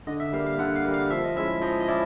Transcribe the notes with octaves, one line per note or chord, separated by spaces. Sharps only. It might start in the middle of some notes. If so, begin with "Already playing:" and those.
D3 D#5
E5
G3 A#3 F5
F5
D3 F#5
F5
G3 A#3
F5
F3 E5
D#5
G#3 C#4 E4 E5
F3 D#5
D#5
C#4 E4 D5